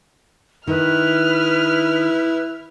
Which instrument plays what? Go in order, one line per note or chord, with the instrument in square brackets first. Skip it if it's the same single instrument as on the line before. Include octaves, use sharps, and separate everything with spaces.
[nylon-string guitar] D#3 [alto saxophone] E4 [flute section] B4 D#6 [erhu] F6